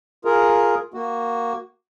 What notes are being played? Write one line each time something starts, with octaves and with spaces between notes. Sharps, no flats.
F4 G#4 A#4
A#3 F#4